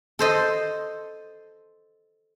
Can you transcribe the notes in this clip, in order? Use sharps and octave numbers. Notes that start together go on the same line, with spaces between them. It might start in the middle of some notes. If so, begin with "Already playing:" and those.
A4 C5 D#5